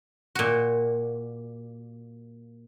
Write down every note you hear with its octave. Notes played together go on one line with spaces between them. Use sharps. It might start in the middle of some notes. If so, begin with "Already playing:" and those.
A#2 F#4